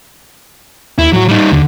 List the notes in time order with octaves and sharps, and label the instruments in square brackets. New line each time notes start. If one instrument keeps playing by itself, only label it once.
[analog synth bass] D#2 [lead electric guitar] E4
[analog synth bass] A2 [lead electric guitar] F#3 F#4
[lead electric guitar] G3 D#4
[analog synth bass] D#2 [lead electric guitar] D3